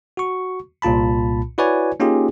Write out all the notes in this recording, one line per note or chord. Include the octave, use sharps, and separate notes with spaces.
F#4 C#6
C2 A#2 F4 A5 B5
E4 F#4 B4 C#5 D5 G#5
A#3 C#4 D#4 F4 G4 G#4